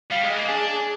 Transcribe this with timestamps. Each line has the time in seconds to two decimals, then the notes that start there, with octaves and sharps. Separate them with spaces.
0.11 G3 F5
0.24 G#3
0.30 D#5
0.36 A#3
0.49 D4 G#4
0.67 G#4